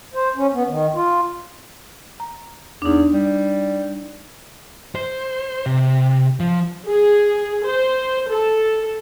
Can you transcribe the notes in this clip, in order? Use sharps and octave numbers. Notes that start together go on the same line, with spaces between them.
C5
C#4
B3
D#3
F4
A#5
E2 D4 D#4
G3
C5
C3
F3
G#4
C5
A4